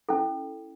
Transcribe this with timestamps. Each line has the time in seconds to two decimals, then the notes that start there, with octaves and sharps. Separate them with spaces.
0.09 C#4 E4 A4